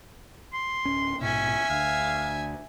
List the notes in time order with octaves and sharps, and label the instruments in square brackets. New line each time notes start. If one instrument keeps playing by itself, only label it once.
[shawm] C6
[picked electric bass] D1 C#4
[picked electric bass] A#1 G#2 B2 [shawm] C#4 [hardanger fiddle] E5 G#5
[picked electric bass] D2 [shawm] F5